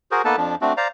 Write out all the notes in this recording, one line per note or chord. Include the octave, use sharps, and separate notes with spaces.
F#4 G#4 A#4 C5
A#3 B3 D#4 A4 B4 A5
F2 F3 D4
A3 C4 D4 F#4
C5 D5 F5 A#5